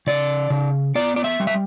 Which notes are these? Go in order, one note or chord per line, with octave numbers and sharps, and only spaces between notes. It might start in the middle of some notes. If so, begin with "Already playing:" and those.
C#3 D5
C#3
B3 D5
D5
E5
G3
E5